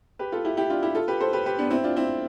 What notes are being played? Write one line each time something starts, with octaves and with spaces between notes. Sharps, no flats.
G4 B4
F4 A4
E4 G4
E4 G4
D4 F4
E4 G4
F4 A4
G4 B4
A4 C5
G4 B4
G4 B4
B3 D4
C4 E4
D4 F4
C4 E4